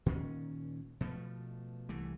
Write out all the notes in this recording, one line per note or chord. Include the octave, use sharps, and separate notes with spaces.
A#2 D#3 C#4
B2 F3 A3
C2 E3 A3